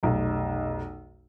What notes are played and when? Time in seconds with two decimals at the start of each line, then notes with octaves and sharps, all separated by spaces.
0.03 F1 B1